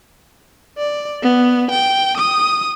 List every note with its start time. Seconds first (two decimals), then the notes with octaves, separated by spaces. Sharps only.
0.78 D5
1.22 B3
1.71 G5
2.17 D#6